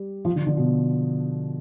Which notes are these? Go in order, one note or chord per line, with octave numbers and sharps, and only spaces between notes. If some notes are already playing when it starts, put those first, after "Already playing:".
Already playing: G3
F3
D3
D3
B2